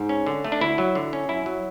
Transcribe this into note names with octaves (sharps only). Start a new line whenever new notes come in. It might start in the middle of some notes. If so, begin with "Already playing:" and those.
Already playing: G#2
C#4
D3
A3
D4
D2 E4
F#3
D3
C#4
F#2 E4
F#3